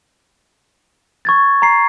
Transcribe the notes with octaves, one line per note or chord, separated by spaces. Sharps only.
C#6 G#6 A6
A#5 C7